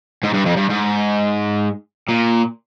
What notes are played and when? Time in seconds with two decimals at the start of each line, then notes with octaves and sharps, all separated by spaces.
0.23 G#2
0.34 G2
0.45 F2
0.56 G2
0.70 G#2
2.08 A#2